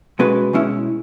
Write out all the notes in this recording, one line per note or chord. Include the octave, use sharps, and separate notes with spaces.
B2 G#3 C#4 F#4 B4
B2 G#3 C#4 E4